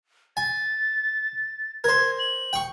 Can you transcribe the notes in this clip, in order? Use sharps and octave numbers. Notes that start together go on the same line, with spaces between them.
G#5 A6
A#4 C5 G#6
F#7
G5 C#6